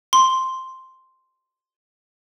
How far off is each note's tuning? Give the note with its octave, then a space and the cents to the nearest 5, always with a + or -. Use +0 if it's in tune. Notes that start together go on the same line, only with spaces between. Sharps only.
C6 +0